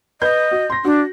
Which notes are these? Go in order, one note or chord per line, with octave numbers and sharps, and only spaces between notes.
B4 D#5 G6
F#4
C6 A#6
D4 F#4